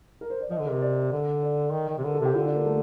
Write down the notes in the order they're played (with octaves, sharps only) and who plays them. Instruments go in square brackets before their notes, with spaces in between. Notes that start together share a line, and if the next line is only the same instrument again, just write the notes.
[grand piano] A#4
C5
D5
[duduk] F3 [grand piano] D#5
[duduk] D3
[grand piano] A#4
[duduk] C3
[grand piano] D5
[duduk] D3
[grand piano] D5
[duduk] D#3
D#3
C3
[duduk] D3 [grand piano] A#4
[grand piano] A4
[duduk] C3
[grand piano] G4
[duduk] D3 [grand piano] F4
[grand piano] D4
A#3
A3